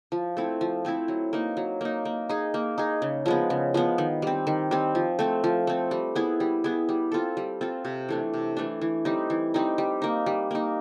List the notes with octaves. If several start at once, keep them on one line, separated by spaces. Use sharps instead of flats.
F3
A3 C4 E4
F3
A3 C4 E4
F#3
A#3 D#4
F#3
A#3 D#4
A#3
D#4 G#4
A#3
D#4 G#4
C#3
F3 G#3 B3
C#3
F3 G#3 B3
D#3
G3 C4
D#3
G3 C4
F3
A3 C4
F3
A3 C4
G3
B3 E4 G#4
G3
B3 E4 G#4
G3
C4 F4 A4
G3
C4 F4 A4
C3
E3 A3 D4
C3
E3 A3 D4
E3
G3 C4 D#4
E3
G3 C4 D#4
G3
A#3 D#4
G3
A#3 D#4